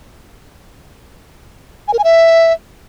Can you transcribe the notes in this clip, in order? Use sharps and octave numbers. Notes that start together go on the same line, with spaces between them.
G#5
A#4
G#5
E5